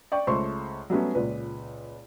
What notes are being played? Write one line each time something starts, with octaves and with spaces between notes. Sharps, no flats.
D5 G5 C#6
C#2 A3 C5 C6 C#6
F#3 G3 A3 B3 C#4
C#2 A#2 B4